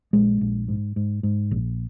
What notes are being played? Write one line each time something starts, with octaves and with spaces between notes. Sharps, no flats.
A#1 G#3
A#1
G#2
G#2
G#2
A#1